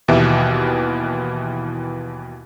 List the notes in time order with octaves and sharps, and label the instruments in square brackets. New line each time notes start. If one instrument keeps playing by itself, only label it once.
[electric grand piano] D#2 B2 E3 G4 E5